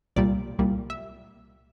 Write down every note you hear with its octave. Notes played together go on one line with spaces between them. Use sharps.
C2 A#2 G3 D5
C2 A#2 G3
E5